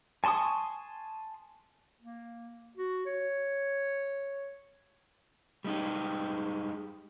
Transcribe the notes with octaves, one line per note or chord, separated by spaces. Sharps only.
G#5 A5 C6 C#6 D#6
A#3
F#4
C#5
G3 G#3 D#4 G4